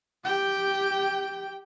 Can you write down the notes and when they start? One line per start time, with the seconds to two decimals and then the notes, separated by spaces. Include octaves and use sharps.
0.24 G4 G5